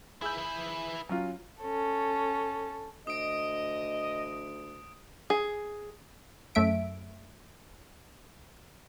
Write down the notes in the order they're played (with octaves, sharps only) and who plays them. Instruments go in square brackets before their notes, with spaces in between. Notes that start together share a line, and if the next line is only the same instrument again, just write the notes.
[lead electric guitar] E4 B4 [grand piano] G#4 E6 G6
[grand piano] F#3 C#4 F4
[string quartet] C#4 A4
[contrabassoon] D2 [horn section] D#5 [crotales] D#6 D7
[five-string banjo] G#4
[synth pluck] F#2 A3 E5 D7